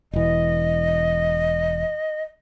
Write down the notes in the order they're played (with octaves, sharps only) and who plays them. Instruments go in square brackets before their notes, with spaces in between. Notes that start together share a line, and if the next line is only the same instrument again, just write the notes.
[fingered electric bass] E1 E3 [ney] D#5